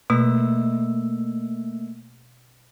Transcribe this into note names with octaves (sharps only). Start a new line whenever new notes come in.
B2 A3 A#3 E6